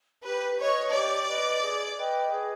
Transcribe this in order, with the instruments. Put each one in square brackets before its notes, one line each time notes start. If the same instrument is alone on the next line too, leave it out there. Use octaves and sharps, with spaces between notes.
[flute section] G4 [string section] B4
[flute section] B4 D#5 [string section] C#5
[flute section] G4 [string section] D5
[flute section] B4 D#5
G#4
B4 D#5 G5
G#4